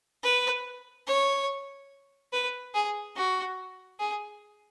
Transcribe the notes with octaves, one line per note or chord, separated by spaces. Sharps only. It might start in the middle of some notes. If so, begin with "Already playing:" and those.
B4
C#5
B4
G#4
F#4
G#4